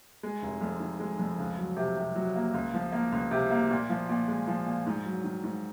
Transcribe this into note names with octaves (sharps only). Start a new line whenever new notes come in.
G#3
F1
F2
D#3
G#3
F2
C#2
F#3
C3
C3
F#3
A#3
C#2
F3
A#3
C#2
C3
A#3
A#2
F3
A#2
G#3
F3
A#2
G#2
F#3
D#3
G#2